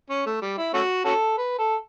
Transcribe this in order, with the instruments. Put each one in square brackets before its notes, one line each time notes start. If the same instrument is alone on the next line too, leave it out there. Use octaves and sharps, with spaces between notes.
[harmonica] C#4
A3
G3
E4
A3 C#4 F#4
C#4 F#4 A4
B4
A4